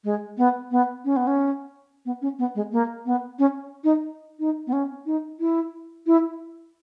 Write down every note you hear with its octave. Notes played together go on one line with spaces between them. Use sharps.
G#3
B3
B3
C#4
B3
C#4
B3
C#4
B3
G#3
A#3
B3
C#4
D#4
D#4
B3
C#4
D#4
E4
E4